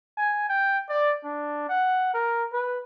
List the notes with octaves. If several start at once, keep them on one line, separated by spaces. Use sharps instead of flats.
G#5
G5
D5
D4
F#5
A#4
B4